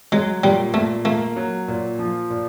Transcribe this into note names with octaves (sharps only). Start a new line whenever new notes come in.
F#3 G#3
A#2 G3
A#2 A3
A3 A#3
F#3
A#2
F3
A#2